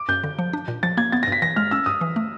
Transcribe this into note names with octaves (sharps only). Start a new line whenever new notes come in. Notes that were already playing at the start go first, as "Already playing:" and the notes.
Already playing: D6
F#2 G6
D3
F3
D4
A#2
F3 A6
A#3 G#6
B3 A6
A#6
G2 B6
E3 A#6
G#3 F6
C#4 E6
G2 D#6
E3
A3